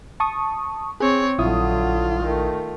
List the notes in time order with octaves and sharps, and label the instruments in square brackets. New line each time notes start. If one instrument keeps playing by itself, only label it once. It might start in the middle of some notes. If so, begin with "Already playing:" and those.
[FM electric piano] A5 C#6 D#6
[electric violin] C4 C#5 [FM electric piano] G#4
[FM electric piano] A#1 E4 D#6 [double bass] D3 F#3 [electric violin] F4
[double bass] D#3 A3